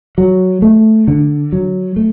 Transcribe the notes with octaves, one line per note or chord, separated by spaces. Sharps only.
F#3
A3
D3
F#3
A3